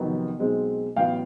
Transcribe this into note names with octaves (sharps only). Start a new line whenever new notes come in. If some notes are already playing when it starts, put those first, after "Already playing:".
Already playing: F2 C3 D#3 F#3 B3
B1 B2 G#3 C4
A1 A2 F#3 B3 F5 G5